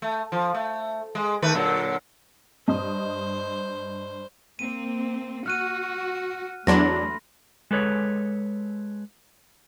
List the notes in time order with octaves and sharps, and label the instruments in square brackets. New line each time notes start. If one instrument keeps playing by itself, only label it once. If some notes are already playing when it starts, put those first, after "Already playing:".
[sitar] A3
F3
A3
G#3
D#3 A3 B4
A#2 D3 F#3
[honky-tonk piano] G2 D#5 D#6 [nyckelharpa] C5
[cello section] A#3 C4 [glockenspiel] D#7
[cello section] F#4 [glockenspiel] F6 F#6 D#7
[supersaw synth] E2 F#3 D4 [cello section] A3 [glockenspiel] B5 C6 A#6
[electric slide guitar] G#3 A4 B4 C#5